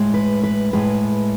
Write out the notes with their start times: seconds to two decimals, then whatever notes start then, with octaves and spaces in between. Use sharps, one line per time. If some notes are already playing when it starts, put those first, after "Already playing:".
Already playing: A2 G#3
0.14 B4
0.43 B4
0.73 A2 G#3 B4